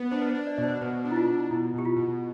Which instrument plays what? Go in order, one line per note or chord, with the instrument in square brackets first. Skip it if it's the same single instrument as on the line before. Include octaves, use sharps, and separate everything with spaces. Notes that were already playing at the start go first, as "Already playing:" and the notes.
Already playing: [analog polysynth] B3
[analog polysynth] D4 [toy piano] C5
[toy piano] B4
[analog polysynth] D4 [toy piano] C5
[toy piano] D5
[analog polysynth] B2 [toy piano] D5
[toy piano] C5
[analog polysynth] B2 [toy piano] B4
[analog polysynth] D4
[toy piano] E4
F4
[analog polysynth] B2
[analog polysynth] B2 [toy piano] E4
[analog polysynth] B2 [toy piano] G4
[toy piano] F4
[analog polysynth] B2